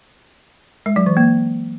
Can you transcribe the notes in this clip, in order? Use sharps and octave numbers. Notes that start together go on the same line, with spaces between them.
G#3
F#3
E3
A#3